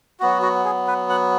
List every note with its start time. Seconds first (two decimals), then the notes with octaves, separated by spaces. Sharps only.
0.20 F#3 B3 F#4
0.42 F#4
0.65 G#4
0.87 B4
1.10 F#5